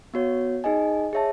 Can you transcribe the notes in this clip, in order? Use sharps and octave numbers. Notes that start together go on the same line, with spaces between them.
B3 F#4 C#5
D#4 G#4 D#5 G#5
G#4 C#5 E5 A5